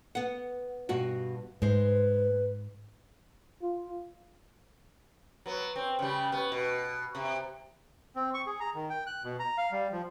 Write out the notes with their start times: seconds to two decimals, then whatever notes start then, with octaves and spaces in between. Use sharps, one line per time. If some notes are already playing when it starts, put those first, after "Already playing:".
0.15 B3 F#5
0.89 G2 B2 F#4
1.62 G#2 G#3 B4 C5
3.62 F4
5.46 F#3 B3
5.76 C4
5.99 C#3 G3
6.32 B3
6.52 B2
7.15 C3
8.16 C4
8.34 C#6
8.47 G#4
8.60 A#5
8.75 D#3
8.90 G5
9.06 F#6
9.24 B2
9.40 A#5
9.58 F5
9.72 G3
9.92 F3